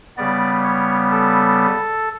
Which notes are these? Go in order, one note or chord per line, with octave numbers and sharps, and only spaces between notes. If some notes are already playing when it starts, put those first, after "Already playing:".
C#3 G3 B3 D5
C#5
A4